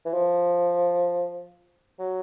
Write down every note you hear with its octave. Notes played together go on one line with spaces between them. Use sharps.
E3
F3
F#3